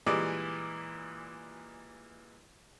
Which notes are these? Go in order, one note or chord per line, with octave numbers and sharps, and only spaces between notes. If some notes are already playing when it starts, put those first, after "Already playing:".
A#2 E3 G3 G#3 D5 D#5